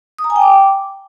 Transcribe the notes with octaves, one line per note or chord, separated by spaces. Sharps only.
D#6
A#5
G#5
G5
D6